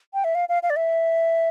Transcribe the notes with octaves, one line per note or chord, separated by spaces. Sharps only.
G5
E5
F5
F5
F5
D5
E5